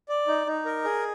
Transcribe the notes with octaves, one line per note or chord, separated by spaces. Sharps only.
D5
D#4
D#4
A#4
G#4